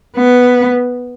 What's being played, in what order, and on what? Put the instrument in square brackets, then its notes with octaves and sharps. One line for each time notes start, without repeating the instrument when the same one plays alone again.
[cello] B3